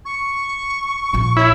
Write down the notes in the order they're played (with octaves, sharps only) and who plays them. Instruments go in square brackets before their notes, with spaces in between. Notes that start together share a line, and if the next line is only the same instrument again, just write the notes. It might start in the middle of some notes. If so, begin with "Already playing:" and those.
[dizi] C#6
[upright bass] A#1 F3
[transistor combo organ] E4 [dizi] C#5